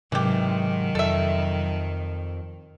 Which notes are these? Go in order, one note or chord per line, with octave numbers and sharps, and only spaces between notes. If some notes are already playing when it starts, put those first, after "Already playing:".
G#2 C3 D#3 E3 F#3 G4
F2 A4 E5